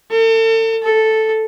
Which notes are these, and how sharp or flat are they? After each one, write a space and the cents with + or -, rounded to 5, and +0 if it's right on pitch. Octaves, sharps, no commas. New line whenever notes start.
A4 +35
A4 -5